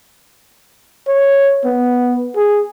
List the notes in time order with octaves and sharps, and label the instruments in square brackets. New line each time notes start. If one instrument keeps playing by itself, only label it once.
[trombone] C#5
B3
G#4